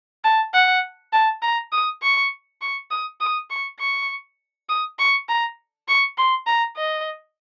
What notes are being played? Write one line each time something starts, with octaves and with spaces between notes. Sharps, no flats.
A5
F#5
A5
A#5
D#6
C#6
C#6
D#6
D#6
C#6
C#6
D#6
C#6
A#5
C#6
C6
A#5
D#5